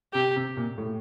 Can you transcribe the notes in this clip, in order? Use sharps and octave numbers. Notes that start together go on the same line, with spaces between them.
C3 G4
C3
A#2
A2